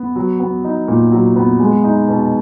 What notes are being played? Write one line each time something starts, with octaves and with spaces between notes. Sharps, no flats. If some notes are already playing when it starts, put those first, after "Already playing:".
Already playing: B3
F#3
B3
D#4
A#2
F#3
B3
G#3
D#4
B2